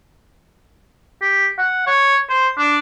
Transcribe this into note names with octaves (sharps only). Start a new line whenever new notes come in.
G4
F#5
C#5
C5
D4